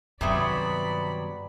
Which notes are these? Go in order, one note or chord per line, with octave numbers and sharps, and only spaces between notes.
G2 C3 D#3 F#3 B3 D5 B5